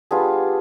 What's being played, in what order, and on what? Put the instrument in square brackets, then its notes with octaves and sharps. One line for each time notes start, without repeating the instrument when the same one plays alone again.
[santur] G3 B3 D4 F4 G#4